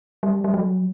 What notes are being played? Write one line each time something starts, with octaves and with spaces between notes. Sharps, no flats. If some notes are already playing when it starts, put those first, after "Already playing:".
G3
G3
F#3